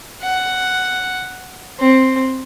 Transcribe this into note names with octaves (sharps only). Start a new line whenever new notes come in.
F#5
C4